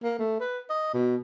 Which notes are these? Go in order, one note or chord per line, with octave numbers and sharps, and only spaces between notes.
A#3
A3
B4
D#5
B2